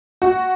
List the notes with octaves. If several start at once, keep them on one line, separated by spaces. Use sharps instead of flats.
F#4